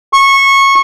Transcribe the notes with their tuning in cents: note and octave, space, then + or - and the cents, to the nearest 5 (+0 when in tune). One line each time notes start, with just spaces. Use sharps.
C#6 -20